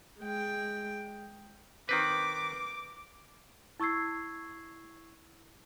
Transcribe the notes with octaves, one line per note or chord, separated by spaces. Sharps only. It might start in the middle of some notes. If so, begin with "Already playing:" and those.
G#3 G5
D#3 C4 B4 D6
E4 C#6 E6 G#6 C7